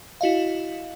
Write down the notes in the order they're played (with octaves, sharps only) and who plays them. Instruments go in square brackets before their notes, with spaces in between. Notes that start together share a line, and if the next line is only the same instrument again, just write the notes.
[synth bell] E4 F#4 D#5 F5